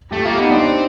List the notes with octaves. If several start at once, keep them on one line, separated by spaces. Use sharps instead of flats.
A3 G4
A#3 F4
B3 D#4
C4 D4